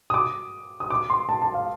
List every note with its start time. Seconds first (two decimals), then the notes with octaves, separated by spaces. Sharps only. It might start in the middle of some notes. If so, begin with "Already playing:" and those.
0.10 D#6
0.14 D6
0.80 D#6
0.90 D6
1.10 C6
1.29 A5
1.42 A5
1.54 F5